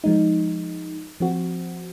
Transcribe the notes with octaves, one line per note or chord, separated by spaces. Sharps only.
F3 G#3 D#4
F3 C4 F#4